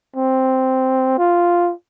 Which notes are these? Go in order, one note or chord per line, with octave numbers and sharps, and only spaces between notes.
C4
F4